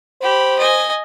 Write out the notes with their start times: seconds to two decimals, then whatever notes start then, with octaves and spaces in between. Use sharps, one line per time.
0.21 G4 C5 B5
0.58 D#5 G#5